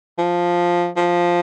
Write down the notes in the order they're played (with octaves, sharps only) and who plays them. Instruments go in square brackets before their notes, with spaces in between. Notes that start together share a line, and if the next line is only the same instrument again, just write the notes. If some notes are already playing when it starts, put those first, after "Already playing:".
[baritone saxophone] F3
F3